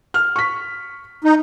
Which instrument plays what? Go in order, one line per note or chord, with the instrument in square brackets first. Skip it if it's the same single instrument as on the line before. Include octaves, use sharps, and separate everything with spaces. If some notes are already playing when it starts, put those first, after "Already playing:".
[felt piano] F6
C#6 B6
[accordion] D#4